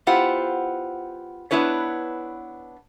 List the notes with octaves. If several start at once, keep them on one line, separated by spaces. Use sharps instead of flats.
B3 E4 F4 G4 C5 F#5
B3 D4 E4 B4 C#5